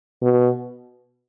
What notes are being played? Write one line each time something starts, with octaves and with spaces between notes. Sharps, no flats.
B2